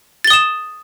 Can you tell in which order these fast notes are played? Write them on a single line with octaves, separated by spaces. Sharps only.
A6 G7 D#6 E7